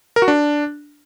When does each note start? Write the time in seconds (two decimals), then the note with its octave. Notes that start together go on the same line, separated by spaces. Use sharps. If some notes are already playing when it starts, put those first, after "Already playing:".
0.16 A#4
0.22 F#4
0.28 D4